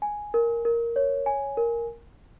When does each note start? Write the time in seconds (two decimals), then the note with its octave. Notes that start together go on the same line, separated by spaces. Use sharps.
0.02 G#5
0.34 A#4
0.65 A#4
0.96 C#5
1.26 G#5
1.57 A#4